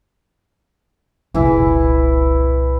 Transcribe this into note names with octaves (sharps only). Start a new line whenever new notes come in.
F1 C2 A#2 E3 E4 B4